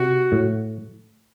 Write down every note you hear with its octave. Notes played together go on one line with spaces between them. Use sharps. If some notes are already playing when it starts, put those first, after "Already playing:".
Already playing: C3 F#4
A2